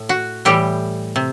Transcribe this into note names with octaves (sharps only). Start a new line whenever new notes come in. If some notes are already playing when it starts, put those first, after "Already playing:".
Already playing: A2
F#4
A2 E3 G3 G4
C3